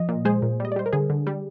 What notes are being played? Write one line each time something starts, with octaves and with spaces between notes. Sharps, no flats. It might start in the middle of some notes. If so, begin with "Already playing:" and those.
Already playing: F3 D#5
A#2
G#3 G#4 C5
A#2
G3 D#5
D5
G3 C5
A#4
D3 G#4
D3
G3